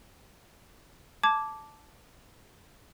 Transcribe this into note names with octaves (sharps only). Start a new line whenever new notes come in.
A5 D6 G#6